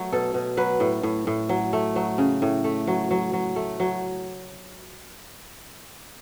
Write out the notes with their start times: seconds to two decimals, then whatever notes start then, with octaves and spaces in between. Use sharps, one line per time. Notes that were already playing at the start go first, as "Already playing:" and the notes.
Already playing: F#3 A3
0.12 B2 A4
0.34 B2
0.57 F#3 B4
0.80 A2
1.03 A2
1.27 A2
1.49 F#3
1.73 A3
1.96 F#3
2.18 C#3
2.42 A2
2.64 A3
2.87 F#3
3.11 F#3
3.33 F#3
3.56 A3
3.80 F#3